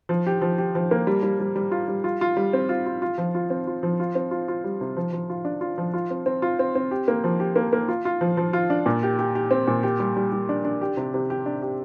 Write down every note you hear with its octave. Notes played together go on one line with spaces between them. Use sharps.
F3
G4
F3
G4
F3
A#3
G3
G3
G3
G3
F4
G3
F4
F4
G3
C4
F4
F4
F4
F3
F4
C4
F4
F3
F4
C4
F4
F4
G3
C3
F3
F3
F4
D4
F4
F3
F4
C4
C4
F4
C4
C4
G4
A#3
F3
G4
A#3
A#3
F4
F4
F3
F3
F4
D4
A#2
G4
G4
G4
C4
A#2
G4
G3
G3
G3
D4
D4
G4
C3
C3
G4
D4
G4